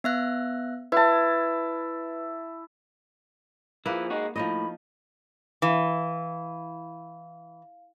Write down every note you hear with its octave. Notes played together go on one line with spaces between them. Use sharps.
B3 E5 F#6
E4 B4 A5
F3 A#3 E4 G#4 B4
G#3 D#4 F#4
A2 F3 D#4 D#5 B5
E3 F5